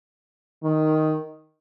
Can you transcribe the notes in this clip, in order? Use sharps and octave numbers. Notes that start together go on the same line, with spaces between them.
D#3